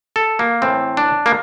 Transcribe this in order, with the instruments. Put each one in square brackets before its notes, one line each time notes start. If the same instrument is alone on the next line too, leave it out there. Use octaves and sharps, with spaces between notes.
[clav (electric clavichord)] A4
A#3
A2 E3 A3 C4
D4
A#3